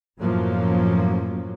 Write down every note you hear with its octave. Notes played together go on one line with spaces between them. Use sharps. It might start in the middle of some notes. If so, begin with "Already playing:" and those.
F#2 A2 F3 F#3 A#3 C#4